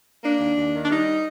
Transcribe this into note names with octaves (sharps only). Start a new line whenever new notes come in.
A#3 D4
D#2
D#2
D#3
D4
G3 D#4